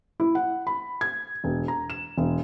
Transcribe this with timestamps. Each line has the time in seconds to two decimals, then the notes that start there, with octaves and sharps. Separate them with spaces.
0.20 E4
0.35 F#5
0.67 B5
1.01 G#6
1.44 E1
1.68 A#5
1.90 E7
2.18 E1